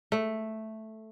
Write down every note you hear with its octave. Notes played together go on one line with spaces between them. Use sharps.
A3